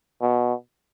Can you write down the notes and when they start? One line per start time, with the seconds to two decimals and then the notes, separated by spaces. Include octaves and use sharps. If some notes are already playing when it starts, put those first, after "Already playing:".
0.22 B2